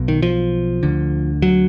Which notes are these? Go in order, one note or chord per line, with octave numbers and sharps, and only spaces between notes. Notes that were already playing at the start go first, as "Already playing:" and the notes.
Already playing: B1 B2
D#3
F3
D2 D3
F#3